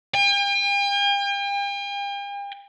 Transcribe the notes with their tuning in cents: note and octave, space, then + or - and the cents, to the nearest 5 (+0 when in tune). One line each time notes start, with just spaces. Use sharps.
G5 +45